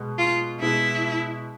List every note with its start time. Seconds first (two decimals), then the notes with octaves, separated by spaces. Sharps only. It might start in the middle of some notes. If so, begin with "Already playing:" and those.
Already playing: B2 G#3 B3
0.18 F4
0.61 B2 G#3 B3 E4